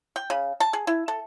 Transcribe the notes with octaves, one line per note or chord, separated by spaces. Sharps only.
G5
C#3
A5
G#4
E4
A4